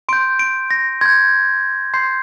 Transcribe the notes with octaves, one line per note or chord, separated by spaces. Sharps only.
C6 G6 D7
D7
A#6
C6 G6 G#6
C6 G6 C7